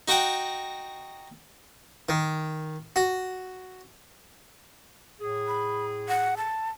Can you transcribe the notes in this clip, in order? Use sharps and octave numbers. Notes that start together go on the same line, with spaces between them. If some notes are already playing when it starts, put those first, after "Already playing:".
D#4 F#4 F#5 G5 A#5
D#3
F#4
A2 G#4
B5
F#5
A5